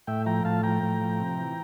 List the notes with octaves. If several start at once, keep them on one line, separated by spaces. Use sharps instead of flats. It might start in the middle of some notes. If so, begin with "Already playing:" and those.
A2 E5 G5
F3 G5 A#5
A2 F5 A5
F3 G5 A#5
A2
F3
C3
E3